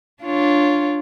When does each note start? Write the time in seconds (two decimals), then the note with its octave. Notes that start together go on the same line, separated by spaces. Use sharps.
0.23 D4 F4 C#5